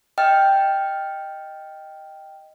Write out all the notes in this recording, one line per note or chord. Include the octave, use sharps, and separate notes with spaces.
D#5 G5 F6